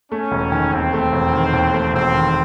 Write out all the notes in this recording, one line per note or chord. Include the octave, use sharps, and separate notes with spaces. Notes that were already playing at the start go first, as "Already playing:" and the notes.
A3 C#4
E1
D#3
D#2 C4
A3
E1
D#3
D#2
A3
E1 C4
D#3